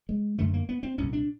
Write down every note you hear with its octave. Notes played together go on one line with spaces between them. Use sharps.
G#3
F#2 D3 A3
A#3
B3
C4
C2 A#2 C#4
D4